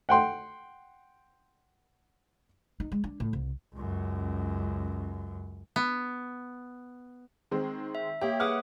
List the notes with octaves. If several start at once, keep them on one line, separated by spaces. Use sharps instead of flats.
F#5 G5 C6
D#4
G#3
D4
A2
C2
C#2 F#2
B3
D#3 G#3 C4
E5
A#3 G4 C#5 E5
G#4 B4 F#5 D6 D#6 F6